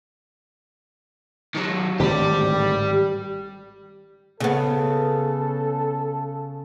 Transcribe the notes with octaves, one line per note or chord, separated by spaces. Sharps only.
D#3 F#3
G#1 A2 D3 G4 D5
C#3 B3 A4